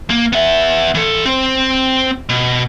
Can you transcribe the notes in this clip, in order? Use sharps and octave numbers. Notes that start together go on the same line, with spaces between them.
A#3
B3 E5
E3 A4
C4 C5
B2